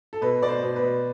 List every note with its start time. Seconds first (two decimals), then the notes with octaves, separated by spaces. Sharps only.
0.13 A4
0.21 B2 B4
0.42 B2 D5
0.49 C5
0.63 B2
0.76 B4
0.83 B2